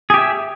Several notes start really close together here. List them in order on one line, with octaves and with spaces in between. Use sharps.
G#4 G4 E5